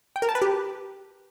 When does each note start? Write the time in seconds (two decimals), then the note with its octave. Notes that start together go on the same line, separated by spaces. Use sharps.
0.16 G5
0.22 A#4
0.29 A5
0.35 B4
0.42 G4